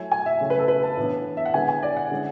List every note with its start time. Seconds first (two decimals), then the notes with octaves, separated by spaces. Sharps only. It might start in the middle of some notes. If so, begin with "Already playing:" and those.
Already playing: F#3 A3 E4 G#5
0.12 G#5
0.26 E5
0.41 C#3 F#3 A3 E4
0.50 B4
0.59 A4
0.68 B4
0.83 A5
0.97 A2 E3 B3 D4
1.37 E5
1.46 F#5
1.54 D3 G#3 B3 E4 G#5
1.68 G#5
1.83 D5
1.97 F#5
2.11 D3 G#3 C#4 E4